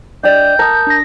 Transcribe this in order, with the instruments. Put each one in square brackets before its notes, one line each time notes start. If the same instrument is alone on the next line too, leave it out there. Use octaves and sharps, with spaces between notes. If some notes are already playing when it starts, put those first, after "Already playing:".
[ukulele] D4 D5 [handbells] D#5 G5 [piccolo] G6
[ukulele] A#4 [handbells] A5 D#6
[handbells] D4 A#6